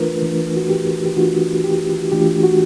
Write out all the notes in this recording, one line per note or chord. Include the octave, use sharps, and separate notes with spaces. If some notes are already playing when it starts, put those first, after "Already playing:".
Already playing: E3 A3 D4 F4 A#4 B4
E3 A3 D4 F4
F#4
G4
G4
E3 A3 D4 F4 F#4
G4
E3 A3 D4 F4 G4
F#4